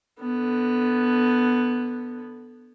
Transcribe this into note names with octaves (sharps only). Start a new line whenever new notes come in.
D3 B3